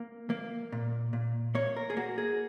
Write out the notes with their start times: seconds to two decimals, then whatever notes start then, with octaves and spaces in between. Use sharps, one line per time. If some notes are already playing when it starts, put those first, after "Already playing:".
Already playing: A#3
0.30 A#3
0.72 A#2
1.13 A#2
1.55 A#3 C#5
1.76 A#4
1.90 G#4
1.97 A#3 F#4
2.18 G#4